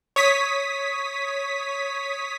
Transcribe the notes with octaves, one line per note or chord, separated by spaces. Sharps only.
C#5 D#6 B6